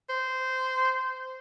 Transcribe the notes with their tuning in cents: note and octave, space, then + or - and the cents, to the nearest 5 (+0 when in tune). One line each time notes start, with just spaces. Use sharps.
C5 -15